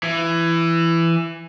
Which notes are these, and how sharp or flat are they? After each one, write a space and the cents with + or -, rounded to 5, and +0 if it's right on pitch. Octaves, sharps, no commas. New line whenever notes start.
E3 +15